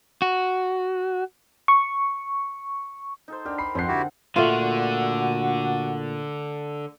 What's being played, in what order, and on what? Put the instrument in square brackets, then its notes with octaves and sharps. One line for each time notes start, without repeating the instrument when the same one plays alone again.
[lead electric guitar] F#4
[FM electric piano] C#6
[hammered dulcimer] D#4 A4 C5
[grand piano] D4 [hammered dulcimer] G4 A#4
[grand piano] B5 C7
[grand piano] F2 C5 C7 [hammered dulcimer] C4 A4 F#5
[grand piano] D3 [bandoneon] E4 F#4 G4
[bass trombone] A#2 [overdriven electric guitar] D3 [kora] A3 F4 [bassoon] F#4